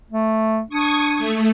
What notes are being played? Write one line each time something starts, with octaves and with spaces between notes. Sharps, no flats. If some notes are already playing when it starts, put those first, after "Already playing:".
A3
D4 C#6 D#6 G#6
A3